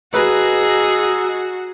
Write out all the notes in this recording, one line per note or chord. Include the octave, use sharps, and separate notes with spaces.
F#4 G#4 B4 D#5 A#5 E6